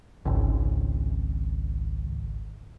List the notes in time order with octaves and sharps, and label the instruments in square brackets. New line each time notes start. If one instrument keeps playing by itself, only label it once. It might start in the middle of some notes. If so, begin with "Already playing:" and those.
[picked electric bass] G#1 C#2